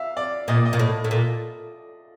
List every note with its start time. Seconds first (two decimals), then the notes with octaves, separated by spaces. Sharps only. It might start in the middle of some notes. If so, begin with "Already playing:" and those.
Already playing: E5 F5
0.17 D5
0.48 A#2 D#5
0.57 D5
0.66 D#5
0.73 A#2
0.79 A2
1.04 A2
1.11 A#2